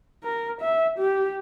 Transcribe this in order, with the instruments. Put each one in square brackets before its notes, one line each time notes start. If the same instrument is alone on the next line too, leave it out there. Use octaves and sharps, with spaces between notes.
[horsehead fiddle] A#4
E5
G4